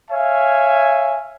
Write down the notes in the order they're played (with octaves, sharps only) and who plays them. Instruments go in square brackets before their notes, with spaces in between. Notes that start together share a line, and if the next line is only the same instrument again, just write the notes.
[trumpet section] C#5 E5 F5 G#5